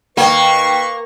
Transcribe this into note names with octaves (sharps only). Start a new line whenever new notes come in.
D#2 A#3 B4 C#6